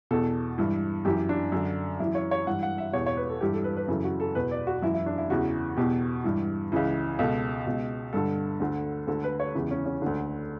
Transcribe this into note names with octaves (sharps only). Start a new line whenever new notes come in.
E2 B2 A4
G2 E3
F#2 E3 G4
D4
F#2 D3
F#2 E3 E4
C#5
C#5
G2 E3 F#5
F#5
E5
E2 B2 C#5
C#5
B4
A4
G2 E3 G4
A4
B4
B4
F#2 C#3 E3 A4
F#4
A4
E2 B2 B4
D5
F#4
F#2 E3 E4
E4
D4
E4
E2 C#3 E3 F#4
E2 B2 G4
G2 E3
C#2 C#3 E3
C#2 B2 A4
C#2 B2
G2 D3 A4
D2 D3
D2 D3 A4
B4
C#5
E2 C#3 E3
C#4
C#4
D2 D3 D4